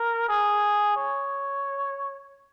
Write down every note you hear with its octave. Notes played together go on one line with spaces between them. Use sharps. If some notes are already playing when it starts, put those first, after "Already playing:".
Already playing: A#4
G#4
C#5